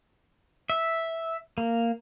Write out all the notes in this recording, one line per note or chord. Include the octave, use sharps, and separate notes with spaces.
E5
A#3